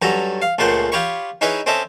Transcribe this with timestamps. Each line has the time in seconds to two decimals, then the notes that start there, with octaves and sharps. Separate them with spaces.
0.02 G2 F#3 C#4 A4 A#5
0.42 F5
0.58 C#2 A#2 C#3 A3 C5 F#5
0.92 F4 G4 C#5 B5 C#6
1.41 C#4 D#4 E4 G#4 B4 E5
1.66 C4 C#4 A4 D#5 E5 A5